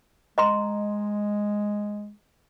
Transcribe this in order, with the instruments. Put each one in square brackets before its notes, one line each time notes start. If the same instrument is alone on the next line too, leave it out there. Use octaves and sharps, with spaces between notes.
[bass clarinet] G#3 [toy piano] D#5 A#5 C6